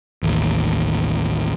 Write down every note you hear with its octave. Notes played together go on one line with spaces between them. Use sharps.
A1 D#2